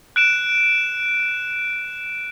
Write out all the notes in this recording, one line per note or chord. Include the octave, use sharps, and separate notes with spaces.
F#6 D7 E7